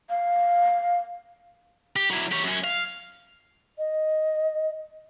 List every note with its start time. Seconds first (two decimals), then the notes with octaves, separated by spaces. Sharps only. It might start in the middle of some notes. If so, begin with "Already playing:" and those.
0.10 F5
1.96 G4
2.11 F#3 E4
2.32 G4 C#5
2.45 F#2 C#4
2.64 F5
3.78 D#5